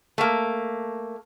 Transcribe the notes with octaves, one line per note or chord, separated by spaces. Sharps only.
A3 A#3